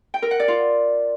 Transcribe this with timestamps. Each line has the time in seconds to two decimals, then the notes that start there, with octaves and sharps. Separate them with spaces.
0.14 G5
0.22 A#4
0.31 F#5
0.40 D5
0.48 F4